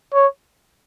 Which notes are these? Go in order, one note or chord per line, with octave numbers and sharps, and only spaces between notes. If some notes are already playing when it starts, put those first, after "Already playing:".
C#5